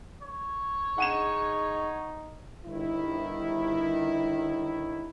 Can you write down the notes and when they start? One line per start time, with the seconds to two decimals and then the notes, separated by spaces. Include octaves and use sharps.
0.22 C#5
0.98 D#4 G#4 F#5 D#7 E7
2.66 G1 D#3 E4